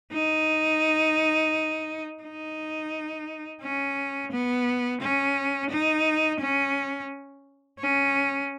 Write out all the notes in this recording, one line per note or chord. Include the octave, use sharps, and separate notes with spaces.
D#4
D#4
C#4
B3
C#4
D#4
C#4
C#4